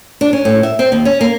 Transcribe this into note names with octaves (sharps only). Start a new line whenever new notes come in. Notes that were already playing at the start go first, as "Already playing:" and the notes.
D4
C#4
A2
E5
C4
D#2
C#4
A#3